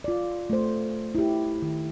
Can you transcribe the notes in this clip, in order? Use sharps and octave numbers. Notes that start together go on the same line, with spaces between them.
F4 D5
A3 C5
E4 G4
D#3